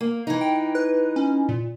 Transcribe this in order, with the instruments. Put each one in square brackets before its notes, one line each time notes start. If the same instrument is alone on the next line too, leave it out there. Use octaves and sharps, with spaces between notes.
[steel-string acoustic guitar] A#3
E3 D#4
[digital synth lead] G5
B4
C#4
A#2